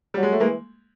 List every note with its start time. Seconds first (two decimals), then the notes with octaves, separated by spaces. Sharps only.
0.14 F#3 G3
0.23 G#3
0.32 A3
0.40 E3 G#3 A#3